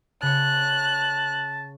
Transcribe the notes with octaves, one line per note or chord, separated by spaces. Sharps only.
C#3 C#5 A5 F#6